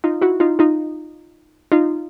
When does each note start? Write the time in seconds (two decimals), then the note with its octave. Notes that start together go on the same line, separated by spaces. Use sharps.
0.04 D#4 F4
0.21 E4 F#4
0.40 D#4 F4
0.59 D#4 F4
1.72 D#4 F4